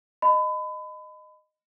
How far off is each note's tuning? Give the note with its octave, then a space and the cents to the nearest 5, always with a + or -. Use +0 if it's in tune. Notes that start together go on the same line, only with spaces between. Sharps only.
D#5 -15 B5 +30